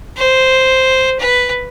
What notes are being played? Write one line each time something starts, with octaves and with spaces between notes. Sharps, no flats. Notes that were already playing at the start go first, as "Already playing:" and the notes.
C5
B4